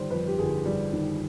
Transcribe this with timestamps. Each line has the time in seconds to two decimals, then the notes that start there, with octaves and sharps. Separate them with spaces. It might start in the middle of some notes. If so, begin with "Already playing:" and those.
Already playing: G1 D#3 G3 C5
0.11 F2 B4
0.27 G4
0.38 G1 G#4
0.66 G3
0.93 D#3